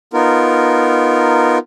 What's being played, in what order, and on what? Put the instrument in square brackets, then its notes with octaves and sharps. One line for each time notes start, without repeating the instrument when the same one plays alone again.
[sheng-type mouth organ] B3 D#4 F4 A#4